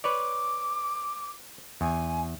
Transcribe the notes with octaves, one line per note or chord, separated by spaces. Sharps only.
B4 C#5 D5 D6
E2 G#5